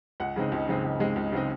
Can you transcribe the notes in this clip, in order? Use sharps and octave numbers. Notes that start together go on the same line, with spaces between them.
C#2 F#5
C#3 G#3 C4 D#4
C#2
C#3 G#3 C4 D#4
C#2
C#3 G#3 C4 D#4
C#2
C#3 G#3 C4 D#4